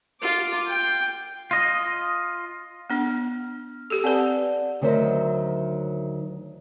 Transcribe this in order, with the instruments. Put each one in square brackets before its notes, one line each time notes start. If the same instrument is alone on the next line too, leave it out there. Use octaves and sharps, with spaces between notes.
[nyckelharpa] F4 D6
G5
[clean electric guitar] F4 D#5
[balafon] B3 D4 [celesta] F6
[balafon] G4 A4 [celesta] E6
[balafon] C4 B4 [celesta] D5 F#5 A5
[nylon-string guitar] D2 D#3 F#3 A#4 C5 E5